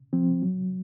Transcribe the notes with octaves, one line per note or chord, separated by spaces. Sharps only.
F3 C4
F#3